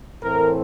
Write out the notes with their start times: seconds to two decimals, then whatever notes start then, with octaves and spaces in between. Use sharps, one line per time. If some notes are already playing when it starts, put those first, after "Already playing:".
0.21 A2 E3 A3 C4 A#4